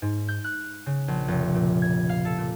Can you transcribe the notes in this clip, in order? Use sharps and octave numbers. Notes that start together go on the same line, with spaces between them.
G#2
G6
F#6
C#3
A#1
F1
A#2
G#6
F5
A4
A#2